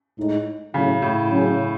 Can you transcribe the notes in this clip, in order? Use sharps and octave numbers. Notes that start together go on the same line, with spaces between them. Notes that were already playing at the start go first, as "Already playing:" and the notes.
A2 G#3 D#4
A2 C#3 F#3 C#4 E4
A2
C#3 F#3 C#4